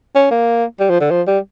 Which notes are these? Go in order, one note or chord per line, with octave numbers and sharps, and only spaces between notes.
C#4
A#3
G3
F3
D3
F3
G3